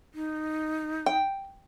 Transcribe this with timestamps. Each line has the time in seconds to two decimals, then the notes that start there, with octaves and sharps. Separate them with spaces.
0.15 D#4
1.06 G5